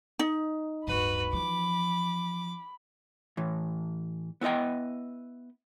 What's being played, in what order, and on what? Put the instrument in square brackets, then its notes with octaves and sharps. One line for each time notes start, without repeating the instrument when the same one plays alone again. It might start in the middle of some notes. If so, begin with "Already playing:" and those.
[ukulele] D#4
[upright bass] D1 G2 [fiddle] F#4 B4 [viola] B5
[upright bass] E3 F3 [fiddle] D6
[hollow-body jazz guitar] A2 E3
B3 E4 B4 D#5 G5